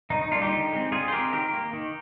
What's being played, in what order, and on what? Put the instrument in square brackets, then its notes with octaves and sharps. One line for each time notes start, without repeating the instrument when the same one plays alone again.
[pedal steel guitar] D#3 D#4
D#4
G3 A#3 D4 F4
D#4 G4
D3
G#3 C4
D3 F4 G#4
C5
G#3 C4 G4 A#4
D#3 G4 A#4
A#3
D#3